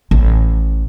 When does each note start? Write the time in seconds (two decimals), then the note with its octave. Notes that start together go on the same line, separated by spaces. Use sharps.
0.11 A1